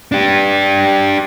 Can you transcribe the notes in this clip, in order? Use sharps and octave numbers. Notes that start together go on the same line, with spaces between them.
D4 G4